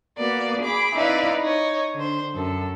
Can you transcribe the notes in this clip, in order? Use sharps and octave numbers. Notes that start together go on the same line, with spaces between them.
A#3 B3 F#4 D5
G#4 B5 D6
C4 D#4 E4 B4 D5 F5
D#4 C#5
D3 C5
F#2 A4